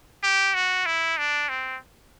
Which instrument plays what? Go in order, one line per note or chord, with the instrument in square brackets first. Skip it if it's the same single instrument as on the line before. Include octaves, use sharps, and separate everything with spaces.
[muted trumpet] G4
F#4
E4
D4
C4